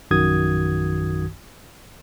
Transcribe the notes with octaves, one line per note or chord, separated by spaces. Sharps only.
A#1 F#2 D#3 F#4 D#6 G#6